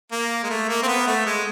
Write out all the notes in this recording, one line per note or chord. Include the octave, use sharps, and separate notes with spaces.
A#3
G#3
A3
A#3
C4
B3
A3
G#3